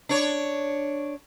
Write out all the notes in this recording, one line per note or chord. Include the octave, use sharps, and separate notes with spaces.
D4 C#5